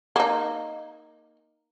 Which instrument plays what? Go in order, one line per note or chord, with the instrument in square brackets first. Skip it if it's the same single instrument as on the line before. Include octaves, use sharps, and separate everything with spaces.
[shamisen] A#3 D#4